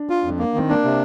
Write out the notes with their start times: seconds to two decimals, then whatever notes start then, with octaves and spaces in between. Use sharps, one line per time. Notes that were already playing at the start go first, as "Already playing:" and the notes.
Already playing: D4
0.10 F4
0.24 F2
0.39 A#3
0.54 D#3 C4
0.69 A#3 D4
0.84 C3